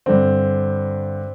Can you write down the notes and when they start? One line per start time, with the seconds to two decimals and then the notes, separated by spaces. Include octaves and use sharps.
0.06 G2 D3 C4